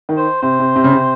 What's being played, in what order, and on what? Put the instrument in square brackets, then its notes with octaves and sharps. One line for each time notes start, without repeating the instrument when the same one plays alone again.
[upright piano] D#3
[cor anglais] C5
[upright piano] C3 [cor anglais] C5
[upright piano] C3
C3
C#3
C3